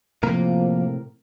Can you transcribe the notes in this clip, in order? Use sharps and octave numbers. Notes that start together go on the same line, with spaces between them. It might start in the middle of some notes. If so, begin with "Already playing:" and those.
A2 C3 F3 A#3 A#4